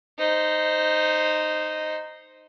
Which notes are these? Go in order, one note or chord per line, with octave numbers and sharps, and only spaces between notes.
D#4 C5